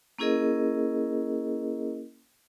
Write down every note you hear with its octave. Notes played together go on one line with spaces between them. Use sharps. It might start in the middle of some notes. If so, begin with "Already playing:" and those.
A#3 C#4 E4 G#4 A#4 D#5